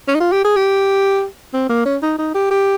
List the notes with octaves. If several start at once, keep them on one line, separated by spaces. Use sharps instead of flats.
C#4
D#4
F4
G4
G#4
G4
C4
A#3
C#4
D#4
D#4
G4
G4